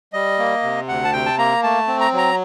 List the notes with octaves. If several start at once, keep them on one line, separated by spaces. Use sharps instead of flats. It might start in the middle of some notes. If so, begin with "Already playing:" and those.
G3 D#5
A#3
C3
D2 F#5
A5
C3 G5
A5
A#3 A#5
A3 A5
C4
A#5
F#3
A#5